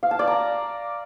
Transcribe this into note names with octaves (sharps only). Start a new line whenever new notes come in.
F5
A5
D5
A#5